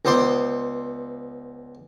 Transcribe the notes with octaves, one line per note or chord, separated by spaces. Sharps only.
C#2 B3 C5 D5 C6